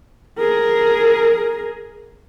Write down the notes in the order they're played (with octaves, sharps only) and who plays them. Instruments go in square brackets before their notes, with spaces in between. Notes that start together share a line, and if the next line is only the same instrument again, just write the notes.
[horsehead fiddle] G#4 A#4